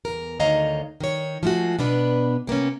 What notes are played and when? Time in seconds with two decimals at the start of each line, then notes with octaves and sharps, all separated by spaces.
0.05 E2 A#4
0.40 D2 D#3 C#5 D#5 F5 A#5
1.01 D#3 C#5
1.43 F3 G#3 A3 F4 F#4
1.79 B2 B3 D4 B4
2.47 C3 A#3 B3 C#4